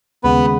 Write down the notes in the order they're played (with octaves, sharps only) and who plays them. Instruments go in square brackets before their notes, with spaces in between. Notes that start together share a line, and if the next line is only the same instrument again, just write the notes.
[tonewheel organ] D#2 C#3 G#3 [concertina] B3 B4